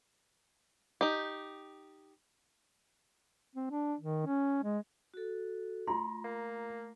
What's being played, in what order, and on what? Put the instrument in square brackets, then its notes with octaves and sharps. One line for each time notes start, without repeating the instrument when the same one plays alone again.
[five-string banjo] D#4 G4
[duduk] C4
D4
D#3
C#4
G#3
[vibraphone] F#4 A4
[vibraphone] A3 [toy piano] F4 C6 [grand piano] A#5
[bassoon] A#3